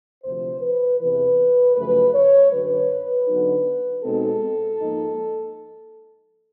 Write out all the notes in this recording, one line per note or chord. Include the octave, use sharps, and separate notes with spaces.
D2 C3 F3 C5
B4
E2 C3 E3 B4
F#2 C#3 F3 A3 B4
C#5
F#2 D3 F#3 B4
D3 F#3 B3 D#4
B2 G#3 C4 D#4 A4
G#2 F3 A#3 D#4